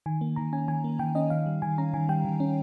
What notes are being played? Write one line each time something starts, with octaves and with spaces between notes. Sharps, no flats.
D#3 G#5
A#3
D#3 A#5
C#4 G#5
D#3 G#5
A#3
D#3 G5
C#4 D#5
D#3 F5
G3
D#3 G#5
C#4 A#5
D#3 G#5
G3 G5
D#3
C#4